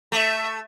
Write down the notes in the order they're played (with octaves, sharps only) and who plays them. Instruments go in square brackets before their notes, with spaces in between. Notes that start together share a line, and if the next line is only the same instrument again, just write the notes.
[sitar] A3 [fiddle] E5